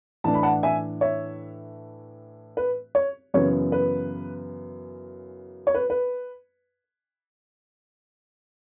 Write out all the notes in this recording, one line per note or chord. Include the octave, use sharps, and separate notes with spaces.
A2 E3 A3 D4 A5
B5
F#5 A5
E5 G#5
C#5 E5
B4
C#5
F#2 C#3 E3 B3 C#5
B4
C#5
B4
B4